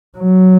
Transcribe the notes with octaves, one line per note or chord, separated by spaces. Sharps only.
F#3